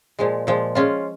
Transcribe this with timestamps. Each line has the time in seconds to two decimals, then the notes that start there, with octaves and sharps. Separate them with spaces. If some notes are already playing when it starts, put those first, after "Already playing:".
0.19 A#2 F3 G#3
0.47 A#2 F3 G#3
0.75 G#3 C#4 F4